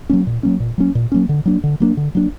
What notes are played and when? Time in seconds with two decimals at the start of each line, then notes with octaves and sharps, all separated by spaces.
0.10 F#3 A#3 C#4
0.27 A#2
0.43 F#3 A#3 C#4
0.60 A#2
0.78 F#3 A#3 C#4
0.95 A#2
1.12 F#3 A#3 C#4
1.29 D3
1.46 F#3 A#3 D4
1.64 D3
1.80 F#3 A#3 D4
1.97 D3
2.15 F#3 A#3 D4